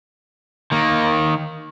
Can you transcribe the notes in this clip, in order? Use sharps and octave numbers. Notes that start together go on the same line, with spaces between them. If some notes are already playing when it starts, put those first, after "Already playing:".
D#3 A#3